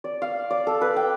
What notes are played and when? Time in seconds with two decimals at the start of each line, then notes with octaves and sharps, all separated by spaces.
0.04 D5
0.22 F5
0.50 D5
0.67 A4
0.81 B4
0.96 G5